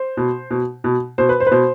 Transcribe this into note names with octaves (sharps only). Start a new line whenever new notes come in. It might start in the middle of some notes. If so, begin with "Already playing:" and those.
Already playing: C5
B2
B2
B2
B2 C5
B4
C5
B4
B2 C5